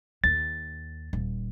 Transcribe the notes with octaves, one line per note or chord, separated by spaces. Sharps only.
D#2 A6
D#1